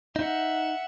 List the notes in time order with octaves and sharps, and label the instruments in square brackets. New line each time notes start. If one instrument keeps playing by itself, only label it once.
[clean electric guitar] D#4 [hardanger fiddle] E5 F#5